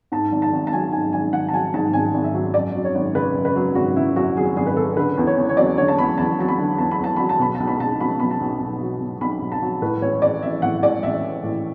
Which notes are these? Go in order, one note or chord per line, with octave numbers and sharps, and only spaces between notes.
G#2 A5
G#1
A5
G#1
A5
F#3 G#5
G#2 G#5
G#1 G#5
G#1 F#5
A5
F#3 G#5
G#2 A5
G#1 G#5
G#1
E5
F#3
F#2 D5
F#3
C#5
G#1
C#3 B4
F#2
B4
F#3
G#1 F#4
C#3 E4
F#2 F#4
F#3 G#4
G#1 G#4
B4
C#3 A4
D3 B4
E2
C#5
E2
C#5
F#3 D5
D3 C#5
A5
E2 B5
E2 A5
F#3 A5
B5
D3
E2 A5
B5
E2 A5
F#3 B5
A5
B2 B5
B1 A5
B5
B1 A5
F#3 B5
B2 B5
A5
B1
B1
F#3
B2
B1 B5
B1
A5
F#3
A2 B4
A1 C#5
A1 D5
E3 E5
E5
A2 F#5
A1 D5
A1 E5
E3
A2